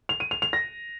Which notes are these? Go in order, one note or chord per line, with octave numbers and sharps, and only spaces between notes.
F7
D#7
F7
F7
A#6